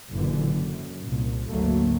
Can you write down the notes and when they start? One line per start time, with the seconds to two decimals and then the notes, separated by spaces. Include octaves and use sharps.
0.12 F#1 A#2 D3 E3
0.50 F#2
1.05 C2 A#2
1.49 G#1 D2 F#3 A3 A#3